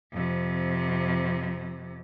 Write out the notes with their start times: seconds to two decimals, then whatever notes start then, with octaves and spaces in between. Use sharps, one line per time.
0.12 F2 C3